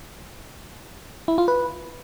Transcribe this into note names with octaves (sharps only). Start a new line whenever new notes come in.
E4
F4
B4